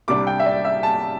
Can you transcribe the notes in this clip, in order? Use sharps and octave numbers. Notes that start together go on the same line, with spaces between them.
C2 C3 G3 D4 D6
G5
E5
D5
E5
A5